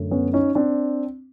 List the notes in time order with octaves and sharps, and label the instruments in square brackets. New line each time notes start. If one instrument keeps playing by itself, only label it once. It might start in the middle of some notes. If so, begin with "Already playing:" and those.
Already playing: [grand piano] F#2 D3 F#3 A3
B3 C#4
C#4 D#4
C4 D4